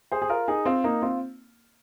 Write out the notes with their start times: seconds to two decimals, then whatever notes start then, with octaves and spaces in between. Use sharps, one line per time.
0.12 G#4 C5
0.22 G#4
0.30 F4 A#4
0.48 D#4 G#4
0.66 C4 F4
0.84 A#3 D#4
1.02 C4 F4